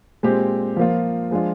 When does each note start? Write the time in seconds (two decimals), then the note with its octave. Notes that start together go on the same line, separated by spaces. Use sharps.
0.23 A#2 G#3 C4 G4
0.76 F3 A#3 F4
1.31 F3 G#3 D4 F4